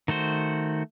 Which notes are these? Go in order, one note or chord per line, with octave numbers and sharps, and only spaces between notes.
D#3 A3 F#4 C5